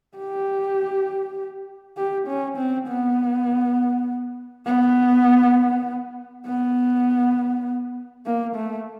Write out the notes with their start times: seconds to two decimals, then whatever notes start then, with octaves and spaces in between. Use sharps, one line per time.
0.18 G4
1.97 G4
2.27 C#4
2.57 C4
2.88 B3
4.66 B3
6.47 B3
8.26 A#3
8.56 A3